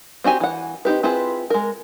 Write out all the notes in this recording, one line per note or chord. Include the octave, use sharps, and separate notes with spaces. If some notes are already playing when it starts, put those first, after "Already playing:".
C4 F#4 G4 G#5
E3 F#5
C4 D#4 G4 B4
C4 E4 F4 G#4 B4
G#3 A#4